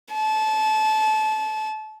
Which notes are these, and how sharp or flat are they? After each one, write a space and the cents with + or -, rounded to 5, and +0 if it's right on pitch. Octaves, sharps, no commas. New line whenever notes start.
A5 -25